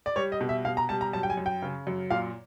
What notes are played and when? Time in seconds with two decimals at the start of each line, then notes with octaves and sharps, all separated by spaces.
0.06 D5
0.16 G3 C#5
0.32 D#5
0.41 B2
0.49 E5
0.65 B2 F5
0.77 A#5
0.89 G3 A5
1.01 A#5
1.13 F#2 A5
1.23 G5
1.30 G#5
1.37 F#2
1.46 G5
1.62 C#3
1.87 F#2
2.10 A#2 F5